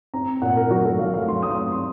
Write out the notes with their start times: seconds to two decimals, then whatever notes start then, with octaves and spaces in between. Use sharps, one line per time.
0.14 C4 A#5
0.42 A#2 F#5
0.57 A#4
0.70 F#3 F#4
0.85 A4
0.99 F#3 F5
1.14 F5
1.28 F#3 C6
1.43 D#6
1.57 C4
1.72 C6